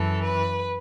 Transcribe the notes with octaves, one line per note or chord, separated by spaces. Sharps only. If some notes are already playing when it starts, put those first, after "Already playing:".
Already playing: F#2 E3 A4
B4